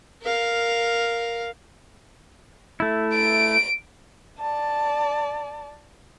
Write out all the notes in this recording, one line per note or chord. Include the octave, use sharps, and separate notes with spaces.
A#4 F5
A3 E4
D7
D5 A5